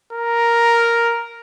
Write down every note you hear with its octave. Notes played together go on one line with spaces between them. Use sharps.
A#4